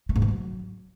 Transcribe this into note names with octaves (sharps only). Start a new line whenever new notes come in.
A3
G#2
D3
F#3